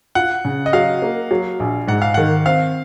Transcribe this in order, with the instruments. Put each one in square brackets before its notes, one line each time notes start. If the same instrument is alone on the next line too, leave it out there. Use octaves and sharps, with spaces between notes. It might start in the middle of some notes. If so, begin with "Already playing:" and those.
[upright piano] F4 [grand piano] F#5
[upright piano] C#3
[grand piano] D#5
[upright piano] F#3 [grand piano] F5
[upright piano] A#3
F#3
A#1
[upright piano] G#2 [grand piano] F#5
[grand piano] F5
[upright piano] D#3 [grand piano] F#5
[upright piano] C4 [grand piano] F5